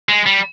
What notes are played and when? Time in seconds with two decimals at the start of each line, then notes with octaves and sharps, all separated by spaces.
0.09 G#3
0.26 G3